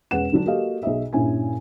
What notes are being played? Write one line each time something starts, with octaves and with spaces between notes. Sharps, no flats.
E1 C#4 G#4 B4 F#5 E7
D3 F#3 D4
A#3 F#4 G4 A4 D#5 F5
B1 G#4 D#5 E5
G2 A#2 C#4 E4 G#5